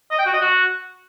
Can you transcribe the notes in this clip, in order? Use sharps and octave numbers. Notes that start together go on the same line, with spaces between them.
D#5
G5
F#4
D#5
F#4